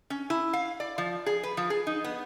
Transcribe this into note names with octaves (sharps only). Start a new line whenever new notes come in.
C#4
E4
F5
D5
F3
G#4
B4
F3
G#4
D#4
B3